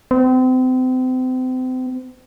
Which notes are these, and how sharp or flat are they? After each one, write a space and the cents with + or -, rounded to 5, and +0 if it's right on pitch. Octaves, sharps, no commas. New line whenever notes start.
C4 -35